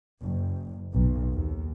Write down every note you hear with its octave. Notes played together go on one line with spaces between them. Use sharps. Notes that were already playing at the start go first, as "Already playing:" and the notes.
F#1
B1
D#2